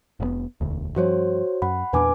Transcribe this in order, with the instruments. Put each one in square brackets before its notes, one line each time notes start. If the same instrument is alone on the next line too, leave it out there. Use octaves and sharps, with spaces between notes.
[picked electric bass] F1 G#2 B3
E1 D2
[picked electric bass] G2 F3 [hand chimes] F#4 C5 C#5
[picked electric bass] F#2 [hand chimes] F#5 B5
[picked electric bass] E2 A#2 D4 [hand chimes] B4 G#5 D6